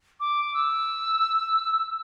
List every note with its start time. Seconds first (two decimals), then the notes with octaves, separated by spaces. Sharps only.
0.20 D6
0.54 E6